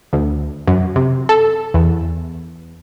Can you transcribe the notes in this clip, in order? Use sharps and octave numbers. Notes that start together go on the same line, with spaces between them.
D2
F#2
C3
A4
E2